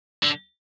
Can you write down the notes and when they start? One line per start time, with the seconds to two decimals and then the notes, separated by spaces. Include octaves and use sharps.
0.23 D3